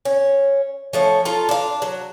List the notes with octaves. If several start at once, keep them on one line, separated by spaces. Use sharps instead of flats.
C#4
F3 A3 C#4
F4 A4 A#5
D4 F5
F#3